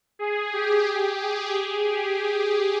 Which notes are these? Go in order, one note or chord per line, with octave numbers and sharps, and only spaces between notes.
G#4
G4
G#4
G#4
G4